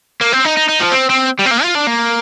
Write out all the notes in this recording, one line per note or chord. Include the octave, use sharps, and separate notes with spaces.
A#3
C4
D#4
D#4
D#4
F3
C4
C4
G3
C4
A#3
F4
D4
A#3